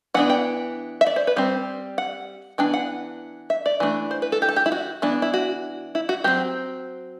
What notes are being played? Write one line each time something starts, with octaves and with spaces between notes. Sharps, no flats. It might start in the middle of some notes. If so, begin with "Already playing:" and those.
E3 B3 D4 F#5
G5
E5
D5
C5
B4
G3 C4 C5
F#5
E3 B3 D4 G5
F#5
E5
D5
E3 A3 D4
C5
B4
A4
G4
A4
G4
E4
F#4
E3 B3 D4
E4
F#4
E4
F#4
F#3 C4 G4